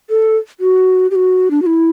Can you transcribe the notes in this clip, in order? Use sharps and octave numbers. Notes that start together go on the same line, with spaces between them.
A4
F#4
G4
F#4
D4
F#4
E4